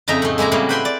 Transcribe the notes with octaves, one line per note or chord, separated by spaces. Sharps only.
F2 C#3 D#4 D#5 E5 A#5
A2 A3
G#3 A#3 E4 G#5 A#5
A2 C#3 F#3 G3 A#3
B4 C5 G5 G#5 B5 C6
D5